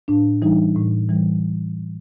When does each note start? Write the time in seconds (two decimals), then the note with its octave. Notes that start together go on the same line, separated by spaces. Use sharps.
0.08 A2 D4
0.42 E3 G3 D#4
0.76 A2
1.09 E3 G3